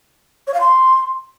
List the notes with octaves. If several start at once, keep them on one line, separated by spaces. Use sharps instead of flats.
C#5
F5
C6